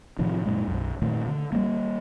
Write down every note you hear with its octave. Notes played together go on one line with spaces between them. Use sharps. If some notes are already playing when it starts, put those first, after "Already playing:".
A2 C3 D#3 F3
F#2 A#2 G#3
B1 F#2
A#2 D#3 A3
D3
G3 G#3 A#3